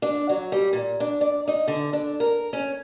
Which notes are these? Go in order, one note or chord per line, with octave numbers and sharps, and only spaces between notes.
D4
F#3
G3
A#2
D4
D5
D#4
D3
D4
A#4
C#4